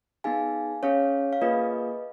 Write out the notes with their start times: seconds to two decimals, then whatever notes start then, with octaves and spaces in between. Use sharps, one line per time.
0.24 B3 D#4 G#4 F5 G#5
0.83 C#4 G#4 C#5 F5
1.33 F5
1.41 A#3 F4 G#4 B4 D#5